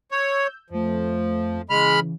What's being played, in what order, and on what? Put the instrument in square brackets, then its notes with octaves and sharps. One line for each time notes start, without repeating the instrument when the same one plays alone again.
[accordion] C#5 [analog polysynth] E6 G6
[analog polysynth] F2 A3 [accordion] F3
[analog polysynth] C#3 E3 [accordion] G#3 B5 F6